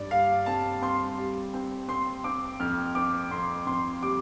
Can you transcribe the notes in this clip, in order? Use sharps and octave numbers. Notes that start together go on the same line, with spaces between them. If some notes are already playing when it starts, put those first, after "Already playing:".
Already playing: G2 D5
G3 F5
C4 A5
C4 C6
G3
C4
C4 C6
C4 D6
F2 F6
C4 D6
F2 C6
F2 C6
G3 D6